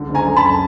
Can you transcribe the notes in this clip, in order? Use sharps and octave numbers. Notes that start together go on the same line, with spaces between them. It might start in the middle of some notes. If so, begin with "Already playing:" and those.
Already playing: C#2 D3
F#1
G#5 A#5
F#2
A5 B5